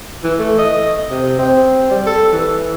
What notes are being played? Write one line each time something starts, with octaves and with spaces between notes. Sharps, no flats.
E3
A3
D#5
C3
C4
G3
A4
E3